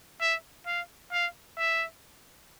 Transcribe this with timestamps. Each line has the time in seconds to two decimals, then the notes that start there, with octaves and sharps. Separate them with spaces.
0.21 E5
0.66 F5
1.12 F5
1.58 E5